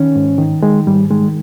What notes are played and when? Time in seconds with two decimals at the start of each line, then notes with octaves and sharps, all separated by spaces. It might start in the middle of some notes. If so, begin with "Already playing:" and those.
Already playing: D#3 C#4
0.16 G#2
0.38 D#3
0.63 D#3 G#3
0.87 G#2 G3
1.10 D#3 G#3